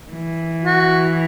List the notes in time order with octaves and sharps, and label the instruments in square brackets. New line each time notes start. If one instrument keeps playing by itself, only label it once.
[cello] E3
[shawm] F#4